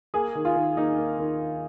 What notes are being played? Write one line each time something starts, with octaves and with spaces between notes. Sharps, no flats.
A#3 G#4
D#3
F4
D#3
A#3 D#4
A#3
D#3